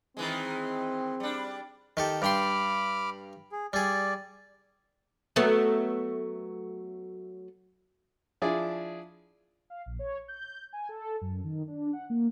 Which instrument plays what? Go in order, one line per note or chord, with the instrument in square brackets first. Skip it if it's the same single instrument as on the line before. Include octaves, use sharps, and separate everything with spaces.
[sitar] D#3 E3 G#3 [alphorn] C4
[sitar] G3 D4
[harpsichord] D#3 G4 A4
[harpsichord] G2 G5 C6 [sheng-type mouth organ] B5 D6 F6
[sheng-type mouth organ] G#4
[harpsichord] G3 G#4 [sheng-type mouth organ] D5
[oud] F#3 A3 B3
[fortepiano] F3 D4 E4 G#4 D5
[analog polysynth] F5
A#1
C#5
G6
G#5
A4
F#2
D#3
D4
F#5
A#3